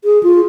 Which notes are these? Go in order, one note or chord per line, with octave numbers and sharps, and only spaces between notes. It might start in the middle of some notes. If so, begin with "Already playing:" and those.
G#4
F4